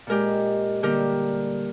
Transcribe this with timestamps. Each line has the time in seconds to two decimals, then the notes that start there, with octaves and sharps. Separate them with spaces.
0.07 A#2 G#3 G4 A#4
0.83 D3 G3 A#3 G4 A#4